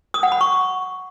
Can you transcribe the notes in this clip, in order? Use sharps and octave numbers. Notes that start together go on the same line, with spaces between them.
D#6
F#5
B5
C#6